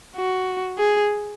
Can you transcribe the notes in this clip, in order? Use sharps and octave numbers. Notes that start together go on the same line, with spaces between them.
F#4
G#4